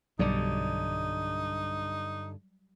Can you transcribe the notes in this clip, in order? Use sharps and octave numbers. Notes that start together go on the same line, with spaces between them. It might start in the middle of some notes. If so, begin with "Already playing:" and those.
B1 G2 D3 F#3 G3 D#4 D5